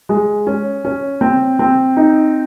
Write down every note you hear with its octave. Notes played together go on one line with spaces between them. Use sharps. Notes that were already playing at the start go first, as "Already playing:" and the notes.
G#3
C#4
C#4
C4
C4
D#4